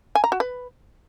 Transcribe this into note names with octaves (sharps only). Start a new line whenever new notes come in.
G#5
A#5
F#4
B4